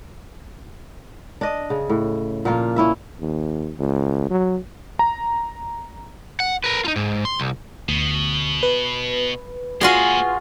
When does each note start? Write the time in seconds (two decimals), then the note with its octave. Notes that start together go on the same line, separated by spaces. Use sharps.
1.41 D4 D#5
1.70 C#3
1.89 A2
2.45 A#2 F3 A#3 F4
2.76 C#4 E4 E5
3.21 D#2
3.79 C#2
4.30 F#3
4.99 A#5
6.40 F#5
6.64 A#4 B4
6.85 D#4 F4
6.96 G#2
7.25 C6
7.40 C2
7.89 D2 B2
8.63 B4
9.81 A#3 F4 F#4 G#4 G#5